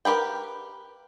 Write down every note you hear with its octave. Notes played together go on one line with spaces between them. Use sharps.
G4 A#4 B4 G5